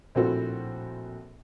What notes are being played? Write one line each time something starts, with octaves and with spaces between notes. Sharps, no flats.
A#1 A2 C4 F4 F#4 A4